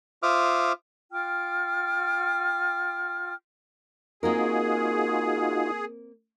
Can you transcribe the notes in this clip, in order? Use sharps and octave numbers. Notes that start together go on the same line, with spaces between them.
F4 C5 E5 D6 D#6 F6
F4 G5 D6 F6
A#3 C4 D#4 F4 F#4 G#4 A#4